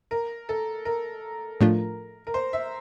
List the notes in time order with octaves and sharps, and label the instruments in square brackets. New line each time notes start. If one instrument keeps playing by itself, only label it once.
[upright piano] A#4
A4
A#4
[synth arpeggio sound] A2 F3 A3 D4 F4
[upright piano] A#4
C5
E5